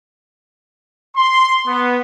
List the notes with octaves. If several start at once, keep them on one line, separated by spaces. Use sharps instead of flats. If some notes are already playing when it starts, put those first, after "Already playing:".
C6
B3